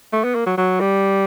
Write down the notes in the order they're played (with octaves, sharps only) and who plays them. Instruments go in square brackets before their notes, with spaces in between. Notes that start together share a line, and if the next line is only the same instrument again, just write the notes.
[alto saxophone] A3
B3
A#3
F#3
F#3
G3